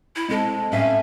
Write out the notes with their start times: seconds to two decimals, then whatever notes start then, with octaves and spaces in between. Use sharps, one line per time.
0.16 E4
0.30 G#3 C4 A4
0.72 A2 C#4 E5 F5